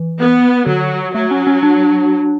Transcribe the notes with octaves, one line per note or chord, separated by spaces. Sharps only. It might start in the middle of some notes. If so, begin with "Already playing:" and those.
Already playing: E3
B3
D3 F#3
F#3 A3
C#4
C#4
D4